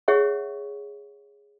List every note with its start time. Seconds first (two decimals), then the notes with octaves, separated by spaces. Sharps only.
0.08 G#4 C#5 E5 F#5 C#6